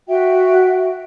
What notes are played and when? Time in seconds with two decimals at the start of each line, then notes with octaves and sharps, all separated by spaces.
0.08 F#4 E5 G5